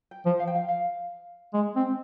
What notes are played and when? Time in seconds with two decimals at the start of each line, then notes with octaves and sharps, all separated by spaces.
0.11 G5
0.26 F3
0.39 F5
0.47 G5
0.55 F5
0.68 F5
1.54 G#3
1.76 C4